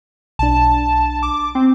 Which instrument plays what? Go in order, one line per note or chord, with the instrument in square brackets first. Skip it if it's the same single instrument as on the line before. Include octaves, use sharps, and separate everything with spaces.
[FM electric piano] B1 D4 [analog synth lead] A5
[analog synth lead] D6
C4